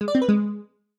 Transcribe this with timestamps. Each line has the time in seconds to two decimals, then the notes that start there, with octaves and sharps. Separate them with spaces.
0.01 G#3
0.08 D5
0.15 C4
0.22 B4
0.29 G#3